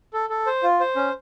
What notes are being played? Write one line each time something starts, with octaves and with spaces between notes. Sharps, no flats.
A4
A4
C5
F4
C5
C#4